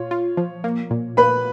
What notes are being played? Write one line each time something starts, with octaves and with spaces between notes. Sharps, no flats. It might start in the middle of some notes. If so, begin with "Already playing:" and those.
Already playing: A#2 F4 C#5
F4
F3
A#3
A#2
A#3 B4 B5